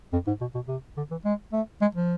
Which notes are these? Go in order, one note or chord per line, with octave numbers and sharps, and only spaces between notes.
F2
G#2
B2
B2
C3
D3
E3
G#3
A3
G#3
F3